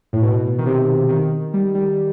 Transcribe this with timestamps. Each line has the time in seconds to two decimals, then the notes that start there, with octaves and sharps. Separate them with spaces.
0.13 A2
0.22 B2
0.58 D#3
0.66 C3
1.09 D#3
1.53 G3
1.75 G3